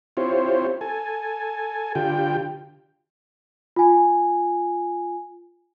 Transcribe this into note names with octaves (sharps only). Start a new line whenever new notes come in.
C4 E4 F4 G4 C5 C#5
A4 G#5
D3 F4 G4 G5
F4 G#5